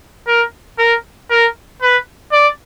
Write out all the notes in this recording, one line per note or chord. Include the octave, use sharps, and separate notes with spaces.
A#4
A#4
A#4
B4
D5